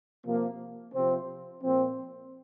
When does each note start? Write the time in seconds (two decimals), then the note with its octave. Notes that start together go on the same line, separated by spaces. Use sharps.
0.25 C3 F3 A#3
0.93 C3 F3 C4
1.62 A#2 F3 C4